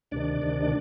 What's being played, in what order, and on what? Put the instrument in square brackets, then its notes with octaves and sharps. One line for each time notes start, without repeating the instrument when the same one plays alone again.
[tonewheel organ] D2 C3 D#3 D4 D5
D2 C3 D#3
D5